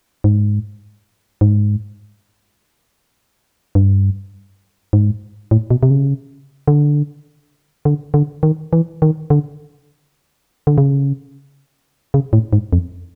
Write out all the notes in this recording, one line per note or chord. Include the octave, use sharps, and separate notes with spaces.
G#2
G#2
G2
G#2
A2
B2
C3
C#3
D3
D3
D3
D#3
E3
D#3
D3
D3
C#3
C#3
A2
G#2
F2